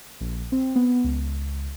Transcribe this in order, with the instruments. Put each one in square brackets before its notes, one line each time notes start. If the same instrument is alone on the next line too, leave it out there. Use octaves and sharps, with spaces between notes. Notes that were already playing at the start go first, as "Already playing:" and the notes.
[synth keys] A#1
C4
B3
C#2